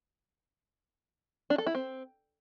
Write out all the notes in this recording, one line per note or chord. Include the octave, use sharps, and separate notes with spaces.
D4
A4
E4
C4